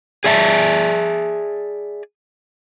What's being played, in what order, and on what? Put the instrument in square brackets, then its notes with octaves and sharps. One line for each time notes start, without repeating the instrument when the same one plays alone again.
[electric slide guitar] G#4 D5 E5 A5